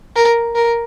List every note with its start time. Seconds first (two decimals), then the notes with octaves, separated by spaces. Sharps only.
0.16 A#4
0.55 A#4